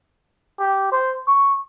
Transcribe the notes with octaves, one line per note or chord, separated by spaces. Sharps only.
G4
C5
C#6